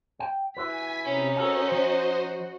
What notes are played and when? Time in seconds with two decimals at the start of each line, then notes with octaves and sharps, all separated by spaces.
0.20 G5
0.57 E4 F#4 B4 G#5 B6
1.05 C3 C#4 D#4
1.36 F#4 A4 A#4 C5 D#5 G#5
1.72 F3